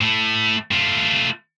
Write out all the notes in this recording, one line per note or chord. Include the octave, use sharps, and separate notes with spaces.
A2 A3
A3 F4